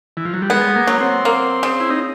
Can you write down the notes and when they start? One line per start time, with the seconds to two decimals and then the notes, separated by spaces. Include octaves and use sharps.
0.17 E3
0.25 F3
0.34 F#3
0.42 G3
0.50 G#3 B3
0.76 A#3
0.87 F#3
1.00 C4
1.25 A#3
1.63 C#3
1.80 E4
1.90 D#4